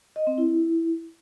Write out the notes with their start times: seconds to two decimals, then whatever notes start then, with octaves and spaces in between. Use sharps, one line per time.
0.16 D#5
0.27 C4
0.38 E4